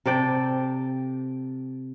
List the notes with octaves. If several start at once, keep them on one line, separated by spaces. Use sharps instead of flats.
C3 A4 D5 G5